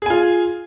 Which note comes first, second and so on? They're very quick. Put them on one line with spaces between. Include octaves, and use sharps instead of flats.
G#4 G#5 F4